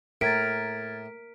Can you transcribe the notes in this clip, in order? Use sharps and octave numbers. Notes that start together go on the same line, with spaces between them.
A2 A#4 F6 G#6 A6 B6 D7